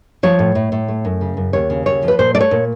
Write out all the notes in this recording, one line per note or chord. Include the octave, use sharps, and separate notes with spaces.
F3 C#5
A2
A2
A2
A3
F#2
C#3
F#2
D#2 C#5
C#3
D#2 C#5
F3
B4
A#2 C5
A3 D5
C#5
A#2